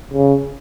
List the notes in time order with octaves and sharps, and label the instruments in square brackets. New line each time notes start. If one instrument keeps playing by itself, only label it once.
[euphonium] C#3